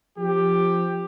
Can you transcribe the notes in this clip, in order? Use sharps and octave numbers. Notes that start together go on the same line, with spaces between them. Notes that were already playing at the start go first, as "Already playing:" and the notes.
F3 C4 G4